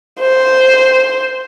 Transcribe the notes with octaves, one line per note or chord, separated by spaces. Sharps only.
C5